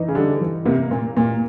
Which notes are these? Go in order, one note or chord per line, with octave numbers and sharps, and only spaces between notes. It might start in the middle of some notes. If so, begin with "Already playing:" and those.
Already playing: E3 D#4
C#3
D3 G3
E3
C3 A#3
A#2 A#3
A#2 A#3